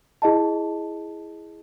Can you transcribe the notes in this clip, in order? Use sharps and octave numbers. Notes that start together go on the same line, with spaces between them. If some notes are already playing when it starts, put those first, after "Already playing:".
E4 G#4 D#5 A5